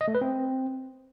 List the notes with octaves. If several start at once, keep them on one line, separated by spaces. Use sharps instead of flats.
D#5
A3
B4
C4